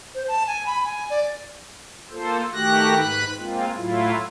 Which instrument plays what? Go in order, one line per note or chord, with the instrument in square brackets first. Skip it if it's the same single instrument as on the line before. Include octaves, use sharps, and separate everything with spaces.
[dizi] C5
A5
G#5
B5
G#5
D5
[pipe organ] A#3 F4 A4 C5
D#3 A3 F#4 G4 F#6 A#6
G#2 B4 B5 F#6
G#3 A#3 C4 F4
A2 F#3 E4 F4